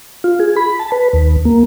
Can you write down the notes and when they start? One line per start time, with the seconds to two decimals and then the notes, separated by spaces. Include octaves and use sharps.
0.24 F4
0.40 G#4
0.56 B5
0.79 A5
0.92 B4
1.13 D#2
1.45 A#3